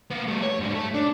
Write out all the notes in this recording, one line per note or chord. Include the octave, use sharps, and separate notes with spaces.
A#3 B3
G3 A3
C#5
G#2 G3
A3
D4